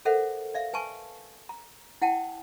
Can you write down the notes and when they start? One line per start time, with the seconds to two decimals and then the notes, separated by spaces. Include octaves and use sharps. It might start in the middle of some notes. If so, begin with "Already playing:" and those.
0.05 A4 A#4 C5 E5 F#5
0.54 D5 E5 F5
0.73 B4 G#5 A5 C#6
1.49 A#5
2.02 E4 F#5 G5 A5